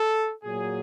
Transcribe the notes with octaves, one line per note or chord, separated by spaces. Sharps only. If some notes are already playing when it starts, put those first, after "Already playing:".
Already playing: A4
A#2 F#3 G#4